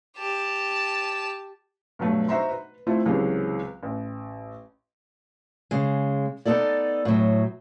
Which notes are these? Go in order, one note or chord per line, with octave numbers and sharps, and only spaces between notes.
G4 A5
G2 B2 F#3 A3
D#4 F#4 C5 E5 A#5 C6
B4
A3 C4 E4 F4
C#2 C3 E3 F#3 G#3
A1
C#3 G#3
B3 D#4 A4 D5
A2 F#3